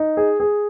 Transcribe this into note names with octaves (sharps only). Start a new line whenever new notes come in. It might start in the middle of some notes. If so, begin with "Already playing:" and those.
Already playing: D#4
G#4
G#4